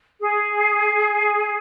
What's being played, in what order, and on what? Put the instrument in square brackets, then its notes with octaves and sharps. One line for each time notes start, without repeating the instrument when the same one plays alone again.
[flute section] G#4